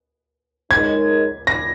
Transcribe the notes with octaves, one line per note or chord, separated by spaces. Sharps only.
G#3 D#4 A#4 C#5 G#6
A#6